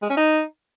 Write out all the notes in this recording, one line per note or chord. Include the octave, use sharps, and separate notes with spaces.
G#3
C#4
D#4